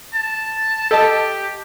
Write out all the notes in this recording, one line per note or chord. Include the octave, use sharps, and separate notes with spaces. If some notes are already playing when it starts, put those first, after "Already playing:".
A5
G4 A4 D#5 A5